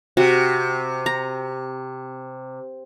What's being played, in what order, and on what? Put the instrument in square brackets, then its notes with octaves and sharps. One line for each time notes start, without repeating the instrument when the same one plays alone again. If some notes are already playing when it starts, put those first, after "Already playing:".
[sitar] C3 [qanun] F#4
[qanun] A#5